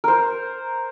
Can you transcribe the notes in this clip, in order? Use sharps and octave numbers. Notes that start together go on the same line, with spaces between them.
A#4 C5